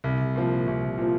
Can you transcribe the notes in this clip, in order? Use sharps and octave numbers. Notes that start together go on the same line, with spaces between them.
C2
A#2 F3
C2
A#2 F3